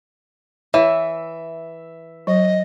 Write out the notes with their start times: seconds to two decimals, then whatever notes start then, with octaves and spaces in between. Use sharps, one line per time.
0.74 E3 C#5 E5
2.27 F#3 D#5